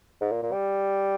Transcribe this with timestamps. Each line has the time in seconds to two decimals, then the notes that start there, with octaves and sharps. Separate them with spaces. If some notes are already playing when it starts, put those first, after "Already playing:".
0.21 G#2
0.32 A#2
0.43 A#2
0.52 G3